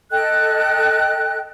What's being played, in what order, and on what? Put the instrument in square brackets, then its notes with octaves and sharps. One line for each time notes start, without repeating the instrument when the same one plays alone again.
[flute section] A4 D#5 G5 F#6